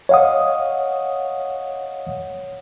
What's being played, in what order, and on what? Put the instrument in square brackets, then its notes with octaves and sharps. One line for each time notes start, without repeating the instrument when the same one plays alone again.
[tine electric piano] C#5 D#5 F5 F#5 D#6